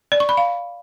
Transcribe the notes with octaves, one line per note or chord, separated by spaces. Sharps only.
D5
C#6
B5
F5